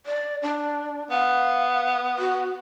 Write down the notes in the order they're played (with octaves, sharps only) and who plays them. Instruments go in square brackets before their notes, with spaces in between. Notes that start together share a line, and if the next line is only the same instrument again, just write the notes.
[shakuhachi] D5
D4
[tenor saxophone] B3 [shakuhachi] F5
[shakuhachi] F#4